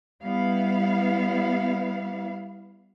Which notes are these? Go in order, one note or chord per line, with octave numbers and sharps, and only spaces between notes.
G3 B3 E4 F5